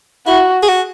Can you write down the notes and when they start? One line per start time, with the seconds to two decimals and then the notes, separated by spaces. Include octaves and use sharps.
0.27 E4 F#4
0.62 G#4
0.68 F#4